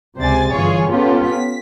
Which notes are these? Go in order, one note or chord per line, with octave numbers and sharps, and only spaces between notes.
C#2 C3 C5 D5 G#5 A6
G1 E3 F4 G#4 C#5
B3 C#4 F4 G4 A4
B6